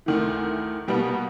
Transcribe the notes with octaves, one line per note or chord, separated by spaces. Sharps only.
D2 D#3 E3
B2 G3 A#3 B3